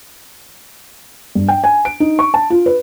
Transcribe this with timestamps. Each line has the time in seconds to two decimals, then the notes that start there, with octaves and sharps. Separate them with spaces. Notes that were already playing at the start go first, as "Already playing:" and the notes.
1.35 G2
1.48 G5
1.64 G#5
1.85 D7
2.00 D#4
2.19 C#6
2.34 A5
2.50 F4
2.66 B4